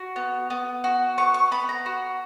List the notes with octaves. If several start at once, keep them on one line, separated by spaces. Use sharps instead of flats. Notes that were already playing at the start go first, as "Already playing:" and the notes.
Already playing: F#4
B3
B3
F#4
B3 C#6
C#6
B3 B5
A#5
F#4